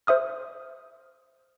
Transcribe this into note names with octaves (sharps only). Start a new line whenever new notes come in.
C5 E5 D#6 F6